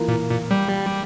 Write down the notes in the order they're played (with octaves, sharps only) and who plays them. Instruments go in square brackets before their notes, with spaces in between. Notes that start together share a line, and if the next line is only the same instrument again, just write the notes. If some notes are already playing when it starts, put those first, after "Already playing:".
Already playing: [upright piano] E3 A#3 F4
[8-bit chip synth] A#2
A#2
G3